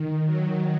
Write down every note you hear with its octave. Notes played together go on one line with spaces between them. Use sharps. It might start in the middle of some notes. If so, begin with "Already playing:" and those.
Already playing: D#3
F#3